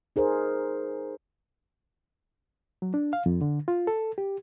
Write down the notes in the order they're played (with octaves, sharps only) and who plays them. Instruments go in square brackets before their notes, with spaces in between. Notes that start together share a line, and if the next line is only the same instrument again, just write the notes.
[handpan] D#4 G#4 A#4 C5
[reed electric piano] F#3
D4
F5
F2
D3
F4
A4
G4